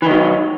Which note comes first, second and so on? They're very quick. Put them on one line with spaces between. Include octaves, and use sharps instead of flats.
E3 D#3 F#3